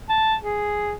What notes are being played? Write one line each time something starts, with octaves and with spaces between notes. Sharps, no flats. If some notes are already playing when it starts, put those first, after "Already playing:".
A5
G#4